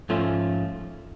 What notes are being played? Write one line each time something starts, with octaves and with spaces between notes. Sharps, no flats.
G#2 F3 A3 C#4 F4